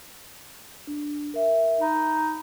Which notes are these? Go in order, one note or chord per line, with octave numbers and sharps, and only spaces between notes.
D4
A#4 E5
D#4 B5